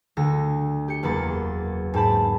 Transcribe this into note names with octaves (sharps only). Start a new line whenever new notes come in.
D2 D3 A#6
G4 C#7
F#1 E2 A#3 B5 A6 C#7
G#2 C4 A5 B5